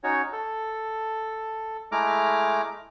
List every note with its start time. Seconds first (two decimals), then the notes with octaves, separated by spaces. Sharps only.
0.04 C#4 D#4 F#4 C#5
0.33 A4
1.92 G#3 A3 E4 A#5 D6 F6